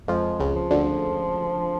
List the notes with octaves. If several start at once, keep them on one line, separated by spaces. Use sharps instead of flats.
F2 F3 G#3
C#2 C#3
F3
D2 D3